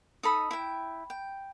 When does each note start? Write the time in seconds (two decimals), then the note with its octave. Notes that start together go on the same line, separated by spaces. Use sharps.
0.23 D#4 A4 B5 D#6
0.51 E4 G5
1.10 G5